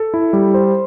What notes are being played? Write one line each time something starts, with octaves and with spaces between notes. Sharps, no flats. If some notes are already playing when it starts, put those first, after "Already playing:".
Already playing: A4
E4
G3
C5